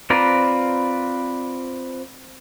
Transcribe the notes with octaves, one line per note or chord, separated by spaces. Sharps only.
C4 F4 B4 D5 A#5